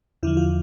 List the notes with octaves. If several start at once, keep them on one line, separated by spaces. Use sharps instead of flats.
E2 D3 F3 E4
F4